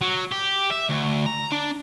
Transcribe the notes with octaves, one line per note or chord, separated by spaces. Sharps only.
F#3
G4
E5
D2
A#5
D4